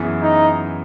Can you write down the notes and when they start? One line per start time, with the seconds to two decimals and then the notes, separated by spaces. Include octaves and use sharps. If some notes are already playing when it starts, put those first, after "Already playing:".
Already playing: F#2 E3 B3 E4 G#4
0.22 D#4